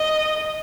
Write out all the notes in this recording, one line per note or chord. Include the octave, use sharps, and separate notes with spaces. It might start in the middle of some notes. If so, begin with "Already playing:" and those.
Already playing: D#5